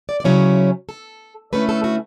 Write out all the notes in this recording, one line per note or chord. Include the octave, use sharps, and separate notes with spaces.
D5
D5
D2 C#3 F#3 C#4 E4 C#5
A4
D3 A3 C#4 E4 B4
A4
F#4